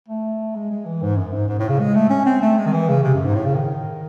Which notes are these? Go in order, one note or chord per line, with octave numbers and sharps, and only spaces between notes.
A3
G#3
G#3
E3
G#2
F#2
G#2
G#2
A2
C#3
G#3
A3
C#4
C4
A3
G#3
D#3
E3
C#3
C3
F#2
G#2
A2
C#3
D#3